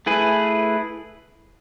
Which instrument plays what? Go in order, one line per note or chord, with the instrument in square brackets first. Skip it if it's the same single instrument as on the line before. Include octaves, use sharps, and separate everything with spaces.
[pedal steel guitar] A3 E4 G#4 B4